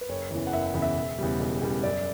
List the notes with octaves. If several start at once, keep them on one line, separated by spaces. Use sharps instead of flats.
B4
F#1 C#5
E2 C#3 E3
F#5
F#1 E5
F#5
E2 C#3 E3
E5
E1
E2 C#3 G3
E1
E2 C#3 G3
F#2 D5